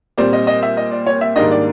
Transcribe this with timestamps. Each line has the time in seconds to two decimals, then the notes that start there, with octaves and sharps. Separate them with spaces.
0.18 A#2 G3 C4 D5
0.33 D#5
0.47 D#5
0.63 E5
0.77 D#5
0.92 D5
1.07 C#5
1.21 E5
1.36 G#2 D#3 G3 A#3 D4 D#5
1.51 D5